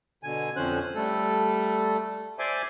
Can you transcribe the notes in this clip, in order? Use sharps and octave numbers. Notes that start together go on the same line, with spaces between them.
B2 D3 G#5
F2 D3 F3 C#4 C5 F#6
G3 A3 A4
C5 D5 E5 G#5 C6 D6